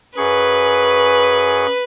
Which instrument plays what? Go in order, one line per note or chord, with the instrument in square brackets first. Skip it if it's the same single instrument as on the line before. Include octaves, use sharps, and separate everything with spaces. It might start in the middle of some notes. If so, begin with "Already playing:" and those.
[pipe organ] F#2 G#4 C#6 [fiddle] B4